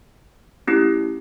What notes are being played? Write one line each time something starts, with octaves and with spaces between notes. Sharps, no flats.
A3 C#4 E4 G4